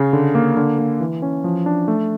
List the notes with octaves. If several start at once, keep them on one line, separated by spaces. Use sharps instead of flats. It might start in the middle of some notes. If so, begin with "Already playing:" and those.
Already playing: C#3
D3
A#3
D3
A#3
E3
C#4
F3
D4
A3